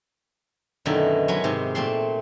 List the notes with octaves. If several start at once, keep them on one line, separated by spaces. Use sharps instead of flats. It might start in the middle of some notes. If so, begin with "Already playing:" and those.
F#2 B2 D3 D#3 E4
F#3 G#3 G#5 B5
G#2 C3
A#2 A3 C4 A5 C6